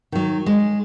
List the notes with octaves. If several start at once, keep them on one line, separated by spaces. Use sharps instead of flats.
D#3 F#3
G#3